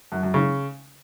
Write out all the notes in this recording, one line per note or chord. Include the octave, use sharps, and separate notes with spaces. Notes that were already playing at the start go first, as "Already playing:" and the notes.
F#2
F#2
C#3